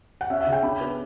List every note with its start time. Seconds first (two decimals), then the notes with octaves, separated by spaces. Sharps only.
0.21 F#5
0.30 C#4 E5
0.41 E5
0.47 C#3
0.52 G5
0.63 D4 B5
0.81 B3